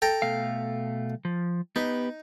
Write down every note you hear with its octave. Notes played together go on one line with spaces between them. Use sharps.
A4 G5 A#5
B2 A3 F5
F3
B3 D#4 G4 B4